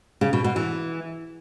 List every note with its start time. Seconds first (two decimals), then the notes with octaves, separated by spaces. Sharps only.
0.21 C#3
0.33 B2
0.44 B2
0.56 E3